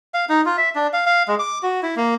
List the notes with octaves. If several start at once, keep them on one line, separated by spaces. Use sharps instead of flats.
F5
D#4
F4
E5
D4
F5
F5
G#3
D6
F#4
E4
A#3